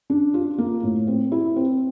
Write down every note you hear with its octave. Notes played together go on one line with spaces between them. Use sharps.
D4
F4
A#3
A2
C4
E4
C4